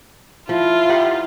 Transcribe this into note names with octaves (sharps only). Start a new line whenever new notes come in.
F3 E4 F4
D#4 G4 F#5